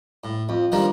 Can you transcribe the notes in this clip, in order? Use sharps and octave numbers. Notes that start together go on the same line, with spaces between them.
A2
F2
D#3 F3 G3 A#3 D4